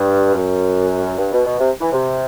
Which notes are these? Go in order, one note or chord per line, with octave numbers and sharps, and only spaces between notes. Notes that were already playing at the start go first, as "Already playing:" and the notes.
Already playing: G2
F#2
G2
B2
B2
C3
E3
C3